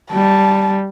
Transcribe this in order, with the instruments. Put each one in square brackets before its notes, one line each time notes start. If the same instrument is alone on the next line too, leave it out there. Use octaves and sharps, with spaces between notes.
[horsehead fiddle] G3 [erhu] A5